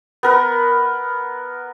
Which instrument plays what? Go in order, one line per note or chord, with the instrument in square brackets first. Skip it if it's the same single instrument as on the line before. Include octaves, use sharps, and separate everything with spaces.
[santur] B3 A#4 B4